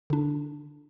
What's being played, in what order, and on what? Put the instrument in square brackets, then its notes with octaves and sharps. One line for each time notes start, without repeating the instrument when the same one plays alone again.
[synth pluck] D3 D4